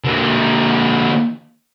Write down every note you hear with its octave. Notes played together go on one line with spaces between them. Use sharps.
D3 A#3